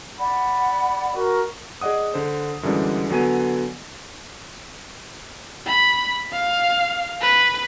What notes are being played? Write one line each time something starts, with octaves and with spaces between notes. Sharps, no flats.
D5 F#5 B5
F#4 A#4
G#4 D5 D#5 F#5 D#6
D3 C5
F#2 D3 E3 G3 G#3 D4
D3 F#3 B3 G#5 D#7
B5
F5
B4